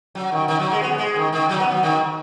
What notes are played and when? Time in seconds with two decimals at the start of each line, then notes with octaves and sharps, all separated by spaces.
0.15 F#3
0.32 D#3
0.48 D#3
0.59 F#3
0.72 G#3
0.82 B3
0.98 G#3
1.16 D#3
1.33 D#3
1.49 F#3
1.60 B3
1.72 F#3
1.83 D#3